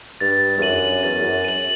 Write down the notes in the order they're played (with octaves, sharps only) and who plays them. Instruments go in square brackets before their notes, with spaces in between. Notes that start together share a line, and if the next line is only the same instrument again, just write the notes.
[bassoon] G2 [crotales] A6
[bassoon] E2
[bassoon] F#2 [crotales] D#7 F#7
[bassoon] E2 [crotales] A6
[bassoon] F#2
[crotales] D#7 F#7